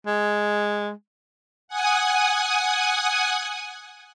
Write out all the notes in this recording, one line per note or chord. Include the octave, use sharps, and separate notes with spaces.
G#3
F#5 G#5 D#6